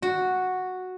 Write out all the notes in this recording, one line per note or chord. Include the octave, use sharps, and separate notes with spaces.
F#4